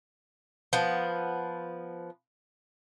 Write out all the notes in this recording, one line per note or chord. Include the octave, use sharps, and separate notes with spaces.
F3 B3